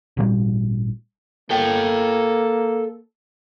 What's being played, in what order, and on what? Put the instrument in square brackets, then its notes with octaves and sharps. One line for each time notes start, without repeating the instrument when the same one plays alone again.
[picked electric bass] G#1 A#2 D#3 G3
[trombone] A#3 [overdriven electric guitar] A4 G5